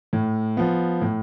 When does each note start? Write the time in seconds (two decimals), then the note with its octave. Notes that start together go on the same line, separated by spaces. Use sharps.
0.13 A2
0.57 F3 B3
1.02 A2